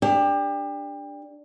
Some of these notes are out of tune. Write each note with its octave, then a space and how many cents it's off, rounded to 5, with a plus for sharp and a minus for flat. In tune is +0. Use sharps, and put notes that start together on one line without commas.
D4 +0 G4 +30